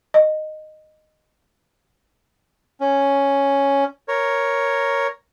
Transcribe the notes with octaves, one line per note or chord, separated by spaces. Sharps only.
D#5
C#4
A#4 C#5